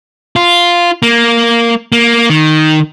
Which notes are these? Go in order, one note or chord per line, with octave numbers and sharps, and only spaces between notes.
F4
A#3
A#3
D#3